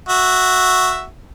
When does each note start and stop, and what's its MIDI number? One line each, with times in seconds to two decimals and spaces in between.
0.09 1.05 66
0.09 1.05 76